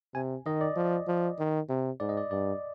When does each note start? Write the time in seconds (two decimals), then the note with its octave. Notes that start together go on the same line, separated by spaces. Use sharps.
0.15 C3 G#5
0.46 D#3 D#5
0.61 D5
0.76 F3
1.08 F3
1.39 D#3
1.69 C3
2.00 G#2 D5
2.09 D#5
2.17 D5
2.31 G2 D5